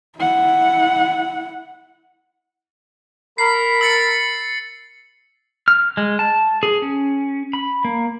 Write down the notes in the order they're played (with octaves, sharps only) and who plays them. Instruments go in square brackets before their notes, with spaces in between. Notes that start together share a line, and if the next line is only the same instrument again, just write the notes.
[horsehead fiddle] E4 F#5
[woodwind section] A#4 B5 [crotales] C7
[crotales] E6 A6 C#7
[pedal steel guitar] F6
G#3
A5
G#4
C#4
B5
A#3